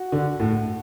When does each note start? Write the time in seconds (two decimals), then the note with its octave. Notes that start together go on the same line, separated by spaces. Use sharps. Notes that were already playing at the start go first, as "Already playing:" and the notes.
Already playing: F#4
0.12 D3
0.40 A2